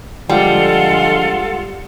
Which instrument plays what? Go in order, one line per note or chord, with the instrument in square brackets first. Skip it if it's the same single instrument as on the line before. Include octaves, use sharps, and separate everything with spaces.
[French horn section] D3 F3 G#3 [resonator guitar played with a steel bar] G3 [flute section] F4 A4 F#5